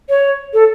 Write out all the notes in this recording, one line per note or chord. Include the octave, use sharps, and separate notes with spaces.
C#5
A4